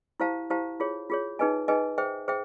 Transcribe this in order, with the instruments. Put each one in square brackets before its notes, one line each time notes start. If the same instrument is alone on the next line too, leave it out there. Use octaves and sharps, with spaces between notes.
[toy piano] E4 G4 C5 F5 A5
E4 G4 C5 F5 A5
F4 G#4 C#5
F4 G#4 C#5
D#4 G#4 B4 D#5 G#5
D#4 G#4 B4 D#5 G#5
G#4 C5 E5 G5
G#4 C5 E5 G5